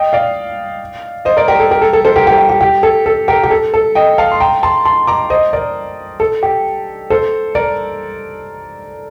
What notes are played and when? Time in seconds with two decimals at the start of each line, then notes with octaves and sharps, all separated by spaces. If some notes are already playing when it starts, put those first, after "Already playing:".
Already playing: D#5 G5
0.13 D5 F5
1.25 C5 D#5
1.37 A#4 D5
1.48 G4 A#4
1.60 A4
1.71 G4 A#4
1.82 A4
1.93 A4
2.05 A4 C5
2.16 G4 A#4
2.27 G4 A#4
2.38 G4
2.49 G4
2.61 G4
2.83 A4
3.06 A4
3.28 G4 A#4
3.43 G4
3.51 A4
3.74 A4
3.95 D#5 G5
4.18 F5 A5
4.32 C6
4.40 G5 A#5
4.63 A5 C6
4.85 A5 C6
5.07 A#5 D6
5.30 C5 D#5
5.53 A#4 D5
6.20 A4
6.43 G4
7.10 A4 C5
7.55 A#4 D5